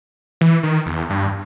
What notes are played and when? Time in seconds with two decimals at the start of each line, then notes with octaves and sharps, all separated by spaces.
0.41 E3
0.63 D#3
0.86 E2
1.10 G2